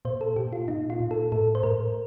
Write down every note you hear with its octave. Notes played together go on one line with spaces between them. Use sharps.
A#2 C5
A4
A#2 G4
F4
A#2 D#4
F4
A#2
A4
A2 A4
C5
A2 A#4